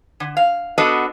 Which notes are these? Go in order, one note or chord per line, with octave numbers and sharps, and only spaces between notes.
D3
F5
B3 D4 F#4 A4 B4 D#5